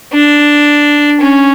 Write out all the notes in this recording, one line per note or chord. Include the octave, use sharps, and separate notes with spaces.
D4
C#4